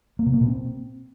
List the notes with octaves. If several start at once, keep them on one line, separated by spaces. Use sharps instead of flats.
A#3
C3
A#3
B2
C4